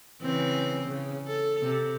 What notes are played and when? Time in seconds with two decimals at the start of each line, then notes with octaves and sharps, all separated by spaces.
0.22 C#3 E3 C4
0.89 C#3
1.27 A4
1.62 C3